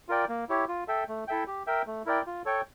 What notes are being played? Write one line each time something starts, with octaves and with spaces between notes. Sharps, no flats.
F4 A#4 D5 G5
A#3
E4 G4 C#5
F4
A4 E5 G5
A3
E4 A4 E5 G5
G4
A#4 E5 G5
A3
E4 A#4 D5 G5
F4
A4 C#5 G5